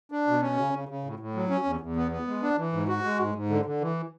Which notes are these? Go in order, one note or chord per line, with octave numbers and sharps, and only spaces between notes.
D4
B2
C#4
C#3
C#3
C#3
A2
A2
F#3
C#4
E2
E2
B3
B3
G#3
D4
E3
G#2
F#4
G#3
G#2
G#2
D3
D3
E3